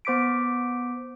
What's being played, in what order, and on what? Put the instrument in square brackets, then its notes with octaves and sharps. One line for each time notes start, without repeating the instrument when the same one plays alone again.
[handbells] B3 C5 D6 B6 D7